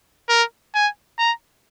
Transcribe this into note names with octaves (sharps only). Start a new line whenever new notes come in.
A#4
G#5
A#5